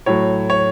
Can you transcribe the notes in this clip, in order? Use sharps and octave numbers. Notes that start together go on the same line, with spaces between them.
A2 F#3 C#5
C#5